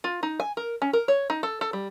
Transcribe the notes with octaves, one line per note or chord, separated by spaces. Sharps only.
F4
D#4
G#5
A#4
C#4
A#4
C#5
D#4
A4
A4
G3